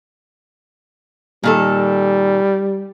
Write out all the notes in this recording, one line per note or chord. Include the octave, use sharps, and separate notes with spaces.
A#2 D#3 G3 A4